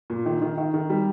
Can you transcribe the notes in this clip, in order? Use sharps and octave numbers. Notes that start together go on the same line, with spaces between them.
A#2
D#3
D#3
D#3
D#3
G3